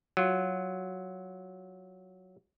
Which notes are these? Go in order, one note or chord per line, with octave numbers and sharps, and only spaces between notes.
F#3 F4